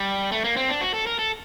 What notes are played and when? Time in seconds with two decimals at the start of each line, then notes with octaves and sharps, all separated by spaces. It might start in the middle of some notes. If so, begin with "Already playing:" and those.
Already playing: G3
0.32 A3
0.44 A#3
0.56 C4
0.69 D4
0.81 F#4
0.94 A4
1.06 A#4
1.19 A4